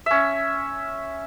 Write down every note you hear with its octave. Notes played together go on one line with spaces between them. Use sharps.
C#4 E5